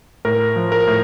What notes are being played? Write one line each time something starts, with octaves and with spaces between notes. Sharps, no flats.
A2 A#4
F3
A#4
A2